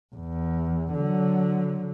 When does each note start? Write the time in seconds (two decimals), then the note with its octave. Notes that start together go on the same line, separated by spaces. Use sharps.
0.15 E2
0.94 D3 F#3